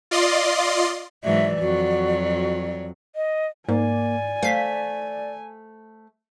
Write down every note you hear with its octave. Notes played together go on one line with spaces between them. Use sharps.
F4 D5 D#5 C6
G#2 E3 F#3 D5 E5
F2 F#3 F#4
D#5
G#2 A#3 D5 G#5
A3 C5 F5 B6